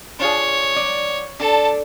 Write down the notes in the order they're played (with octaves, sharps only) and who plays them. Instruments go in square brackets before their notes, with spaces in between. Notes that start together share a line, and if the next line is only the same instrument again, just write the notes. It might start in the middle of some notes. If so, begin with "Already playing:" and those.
[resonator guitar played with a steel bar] D4 F4 G#4 [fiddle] C#5
[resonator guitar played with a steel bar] F#3 D5
[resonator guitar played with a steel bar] D4 [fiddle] A4 A5